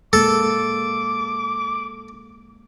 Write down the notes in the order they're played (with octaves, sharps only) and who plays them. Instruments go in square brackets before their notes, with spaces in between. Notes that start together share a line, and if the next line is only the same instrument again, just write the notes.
[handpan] G#3 A#3 [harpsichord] A4 [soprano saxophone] D6